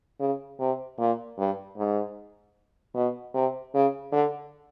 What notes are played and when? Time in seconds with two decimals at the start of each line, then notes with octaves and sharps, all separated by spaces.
0.20 C#3
0.60 C3
0.99 A#2
1.38 G2
1.77 G#2
2.95 B2
3.34 C3
3.74 C#3
4.12 D3